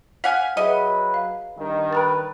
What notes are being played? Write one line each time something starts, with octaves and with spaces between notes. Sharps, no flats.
F5 F#5 G#5 F6 B6
F#3 G#4 B4 D#5 E5 F#5
F5
G2 D#3
B4 G5 A#5 A6